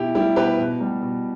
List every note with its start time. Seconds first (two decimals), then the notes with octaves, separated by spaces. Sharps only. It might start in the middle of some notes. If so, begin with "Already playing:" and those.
Already playing: B2 E4 G4
0.15 G3 E4 G4
0.36 B2 G4 B4
0.58 B2
0.81 G3
1.02 B2